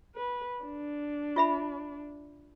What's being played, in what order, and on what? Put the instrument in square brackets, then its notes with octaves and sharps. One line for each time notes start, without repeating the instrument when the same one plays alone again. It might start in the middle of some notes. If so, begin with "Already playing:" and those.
[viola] B4
D4
[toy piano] F4 E5 B5